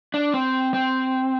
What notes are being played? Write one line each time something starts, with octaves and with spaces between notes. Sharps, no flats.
D4
C4
C4